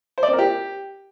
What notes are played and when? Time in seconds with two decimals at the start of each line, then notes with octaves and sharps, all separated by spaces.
0.18 C5
0.23 D5
0.28 C4
0.33 A#4
0.38 G4